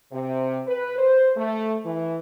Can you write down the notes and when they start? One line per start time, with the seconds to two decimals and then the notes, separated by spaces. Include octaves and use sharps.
0.12 C3
0.67 B4
0.98 C5
1.37 A3
1.85 E3